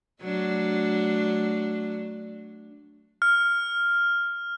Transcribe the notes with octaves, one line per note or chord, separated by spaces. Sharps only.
F#3 A3 D4
F6